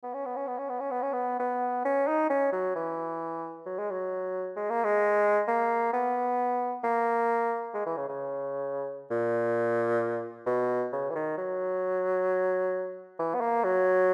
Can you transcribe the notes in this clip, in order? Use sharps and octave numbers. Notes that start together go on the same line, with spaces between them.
B3
C#4
B3
C#4
B3
C#4
B3
C#4
B3
C#4
B3
B3
C#4
D#4
C#4
F#3
E3
F#3
G#3
F#3
G#3
A#3
G#3
A#3
B3
A#3
G#3
E3
C#3
C#3
A#2
B2
C#3
E3
D#3
F#3
E3
B3
A#3
F#3